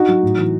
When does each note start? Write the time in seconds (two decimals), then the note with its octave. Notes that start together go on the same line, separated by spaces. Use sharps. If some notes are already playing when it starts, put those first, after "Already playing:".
Already playing: D#4 F#4
0.09 F#3
0.23 A2
0.38 E3